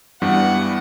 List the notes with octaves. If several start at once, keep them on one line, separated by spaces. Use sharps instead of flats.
G2 E3 G3 B3 D4 F#5